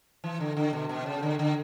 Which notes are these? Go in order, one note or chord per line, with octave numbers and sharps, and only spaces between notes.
E3
D3
D3
B2
B2
C#3
D3
D3